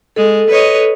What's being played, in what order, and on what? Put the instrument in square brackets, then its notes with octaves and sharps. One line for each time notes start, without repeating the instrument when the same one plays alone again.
[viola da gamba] G#3 [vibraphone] A4
[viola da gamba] B4 C#5 D#5